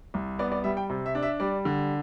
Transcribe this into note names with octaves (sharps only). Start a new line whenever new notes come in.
C2
B3 D5
D5
G3 E5
G5
C3
E5
D4
E5
G3 D5
D3